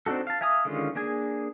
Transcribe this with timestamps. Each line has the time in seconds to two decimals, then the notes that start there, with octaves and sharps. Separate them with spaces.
0.06 C4 D4 D#4 F#4 A4
0.27 F5 A5
0.41 E5 F5 G#5 A#5 D#6
0.65 D3 D#3 G#3 C#4 F4
0.95 A#3 D4 G#4 G#5